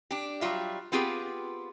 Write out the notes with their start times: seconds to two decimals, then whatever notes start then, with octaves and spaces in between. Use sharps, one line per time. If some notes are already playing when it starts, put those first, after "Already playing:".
0.11 D4 G4
0.41 F#3 G3 F4 E5
0.92 B3 C4 F4 G4 G#4 B4